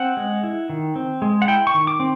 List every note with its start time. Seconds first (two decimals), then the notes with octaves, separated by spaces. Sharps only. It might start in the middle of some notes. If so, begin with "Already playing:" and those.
Already playing: C4 F#5
0.17 G#3
0.44 E4
0.70 D#3
0.96 C4
1.22 G#3
1.42 F#5
1.48 E4 G5
1.67 C#6
1.74 D#3
1.87 D6
2.00 C4